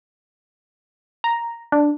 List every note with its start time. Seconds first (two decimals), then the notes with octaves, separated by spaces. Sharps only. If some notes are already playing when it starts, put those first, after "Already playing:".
1.24 A#5
1.72 D4